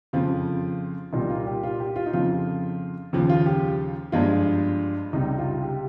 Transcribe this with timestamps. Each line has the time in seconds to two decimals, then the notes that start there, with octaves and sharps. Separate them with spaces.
0.13 F2 C#3 F3 F4
1.13 C2 A#2 G3 D#4
1.30 F4
1.47 G4
1.63 F4
1.80 G4
1.96 F4
2.06 D#4
2.13 F2 C#3 F3 F4
3.13 D#2 C#3 F3
3.29 F4
3.46 G4
4.12 G2 F3 G#3 F4
5.13 C#2 C3 G3 D#4
5.38 F4
5.63 G4